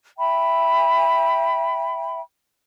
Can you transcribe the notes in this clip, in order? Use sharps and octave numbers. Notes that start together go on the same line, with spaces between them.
E5 G5 B5